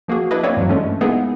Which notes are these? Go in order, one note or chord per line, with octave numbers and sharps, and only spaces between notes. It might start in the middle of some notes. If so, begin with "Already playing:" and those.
F3 A#3 F#4 G#4
D4 E4 B4 D#5
A#3 C4 D4 B4 C#5 D5
G2 E3 F#3
C#3 G#3 A3 C#4 D4
G#3 A#3 B3 D#4 E4 G#4